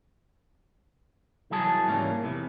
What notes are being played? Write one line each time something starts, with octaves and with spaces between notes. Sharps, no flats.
C2 E3 F#3 G#4 A5
G#2 E3 G3 A#3 C#4
E2 C3 E3